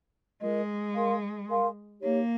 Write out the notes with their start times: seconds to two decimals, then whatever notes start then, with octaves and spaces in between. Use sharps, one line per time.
0.41 G#3 F4 A#4 D#5
0.95 A#4 F5 G#5 C6
1.49 A#4 F5 G#5 C6
2.01 A#3 D#4 G4 C#5